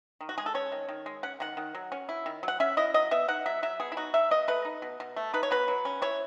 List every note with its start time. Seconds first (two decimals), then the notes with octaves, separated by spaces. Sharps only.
0.21 D#3
0.29 F#4
0.38 G#3 G#4
0.46 A4
0.54 C#4 C#5
0.72 D#3
0.88 D#3
1.06 G#3
1.23 C#4 F#5
1.40 D#3 F#5
1.57 D#3
1.75 F#3
1.92 C#4
2.09 E4
2.26 D#3
2.43 F#3
2.48 F#5
2.60 C#4 E5
2.77 E4 D#5
2.94 F#3 D#5
3.11 B3 E5
3.28 D#4 F#5
3.46 F#3 E5
3.63 F#3 E5
3.80 B3 G#4
3.92 E4
3.97 D#4 F#4
4.14 F#3 E5
4.31 B2 D#5
4.48 A3 B4
4.65 D#4
4.82 B2
5.00 B2
5.16 A3
5.34 D#4 B4
5.43 C#5
5.51 B2 B4
5.68 F#3
5.85 C#4
6.02 E4 C#5